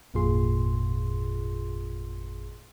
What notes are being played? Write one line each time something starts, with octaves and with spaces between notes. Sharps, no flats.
G#1 F2 A#2 F4 G#4 C6